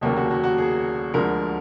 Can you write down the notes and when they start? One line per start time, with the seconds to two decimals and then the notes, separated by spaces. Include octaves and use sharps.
0.01 F1 D#2 C#3 F#3 A#3 G4
0.17 F#4
0.31 F#4
0.44 F#4
0.58 G#4
1.14 D2 D3 F3 G#3 A#4